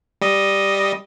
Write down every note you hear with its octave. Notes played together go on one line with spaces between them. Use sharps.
G3 D#5